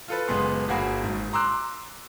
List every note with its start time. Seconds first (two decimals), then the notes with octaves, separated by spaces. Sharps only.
0.08 F4 A4 B4
0.28 F#1 G#3 B3 C6
0.68 G1 A#3 F#4 G#4 B5
1.03 G#1 G#2
1.33 A#5 C6 D6 E6 F#6